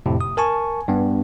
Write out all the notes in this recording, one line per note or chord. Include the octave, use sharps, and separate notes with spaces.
F2 A2 C3
D#6
A#4 G#5 A5 C#6
G2 B3